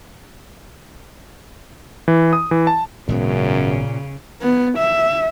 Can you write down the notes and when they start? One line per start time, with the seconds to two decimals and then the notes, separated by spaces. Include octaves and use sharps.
2.08 E3
2.33 D#6
2.51 E3
2.67 A5
3.09 G#1 F#2 A#2 C#3 G#3 B3
4.42 B3
4.78 E5